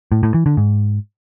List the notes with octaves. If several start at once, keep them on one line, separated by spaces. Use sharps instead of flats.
A2
A2
E3
D3
G#2